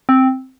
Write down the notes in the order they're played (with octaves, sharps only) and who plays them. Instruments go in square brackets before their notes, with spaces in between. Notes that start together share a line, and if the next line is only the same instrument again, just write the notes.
[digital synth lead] C4